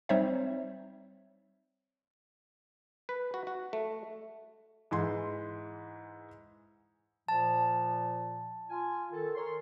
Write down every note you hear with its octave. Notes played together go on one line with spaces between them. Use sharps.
G3 C4 D#4 C5 C#5 E5
B4
F#4
F#4
A3
G#2 E3 C6
A#2 F3 A5
F4 G#5
D#3 A4
A#4 C#5 C6